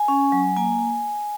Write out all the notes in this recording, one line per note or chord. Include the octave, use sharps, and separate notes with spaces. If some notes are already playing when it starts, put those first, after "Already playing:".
Already playing: G#5
C#4
F#3
A#3 G#5